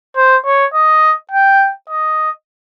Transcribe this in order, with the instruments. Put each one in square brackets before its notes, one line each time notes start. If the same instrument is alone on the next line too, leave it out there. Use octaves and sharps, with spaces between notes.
[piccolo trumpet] C5
C#5
D#5
G5
D#5